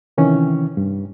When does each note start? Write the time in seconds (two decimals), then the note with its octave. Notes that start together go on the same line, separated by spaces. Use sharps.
0.18 C3 D#3 E3 C#4
0.77 G2